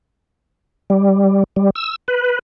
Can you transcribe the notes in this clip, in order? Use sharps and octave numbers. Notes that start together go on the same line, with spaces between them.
G3
G3
E6
B4